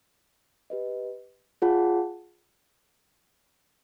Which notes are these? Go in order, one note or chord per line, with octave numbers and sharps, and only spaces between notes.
G4 B4 D#5
F4 G#4 C#5 F#5 A5